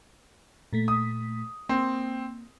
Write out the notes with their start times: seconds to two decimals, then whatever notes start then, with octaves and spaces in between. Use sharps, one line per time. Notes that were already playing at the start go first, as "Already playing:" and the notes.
0.73 A#2 A3 B6
0.88 D#6
1.69 A#3 C4